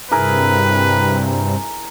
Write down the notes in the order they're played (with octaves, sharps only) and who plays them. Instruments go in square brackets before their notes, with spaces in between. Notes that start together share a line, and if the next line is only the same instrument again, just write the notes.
[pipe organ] G2 C3 [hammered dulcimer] E4 G#4 A#4 [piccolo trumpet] B4